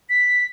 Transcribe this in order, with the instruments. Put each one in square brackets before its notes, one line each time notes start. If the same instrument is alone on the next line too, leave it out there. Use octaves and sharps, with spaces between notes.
[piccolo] B6